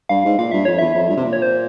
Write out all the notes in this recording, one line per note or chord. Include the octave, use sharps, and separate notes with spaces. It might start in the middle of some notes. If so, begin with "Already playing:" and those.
G2 F5
G#2
A#2 F5
G2 E5
F2 C#5
E2 E5
F2
G2
C3
A#2
C#5
C5